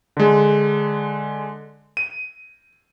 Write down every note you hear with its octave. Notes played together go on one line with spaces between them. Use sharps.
D3 G#3
D#7